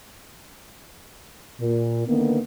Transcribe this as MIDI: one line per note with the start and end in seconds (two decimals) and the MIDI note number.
1.61 2.03 46
2.07 2.39 50
2.07 2.39 51
2.07 2.39 58
2.07 2.39 59